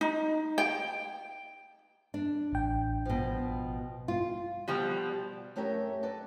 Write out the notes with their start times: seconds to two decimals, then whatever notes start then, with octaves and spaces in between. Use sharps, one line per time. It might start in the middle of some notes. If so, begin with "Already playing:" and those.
0.01 D#4
0.58 G5
2.14 D4
2.52 A1 G5
3.05 B2 F3
4.08 F4
4.68 B2 F3 G3
5.56 F#2 A3 C#4 G4 A#4 E5
6.03 A4 B4 D5